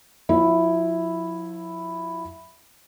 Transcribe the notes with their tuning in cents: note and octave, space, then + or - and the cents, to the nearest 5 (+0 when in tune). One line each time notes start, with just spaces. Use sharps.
F3 +40 E4 +0